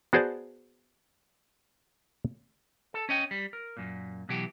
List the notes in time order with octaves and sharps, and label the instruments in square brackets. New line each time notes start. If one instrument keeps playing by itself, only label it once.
[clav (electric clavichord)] B3 F#4 G#4 C5 D5 A5
[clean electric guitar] A4
C#4 C#5 D#5 G5
G3
A#4
F#2 A#2
B2 E3 F#3 G4